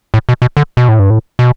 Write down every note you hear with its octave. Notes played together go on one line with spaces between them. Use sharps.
A2
B2
B2
D3
B2
A2
G2
A2
B2